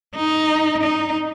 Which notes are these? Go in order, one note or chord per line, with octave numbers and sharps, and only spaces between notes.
D#4
D#4